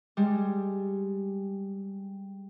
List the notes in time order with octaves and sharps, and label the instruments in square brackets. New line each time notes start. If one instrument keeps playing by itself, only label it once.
[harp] G3 G#3